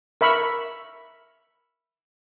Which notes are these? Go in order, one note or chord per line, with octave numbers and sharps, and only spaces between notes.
A#4 E5 B5 C#6